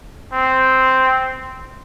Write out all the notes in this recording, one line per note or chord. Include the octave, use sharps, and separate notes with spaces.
C4